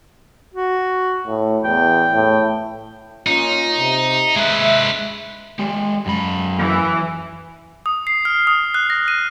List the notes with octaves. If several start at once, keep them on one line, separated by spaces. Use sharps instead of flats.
F#4
A2
E2 G5
A2
A#3 C#4 D#4 F4
C3
G#3 B4 E5
G#3 G4
F#2 B5
E3
D#6
C7
F6
D#6
F#6
A#6
D#7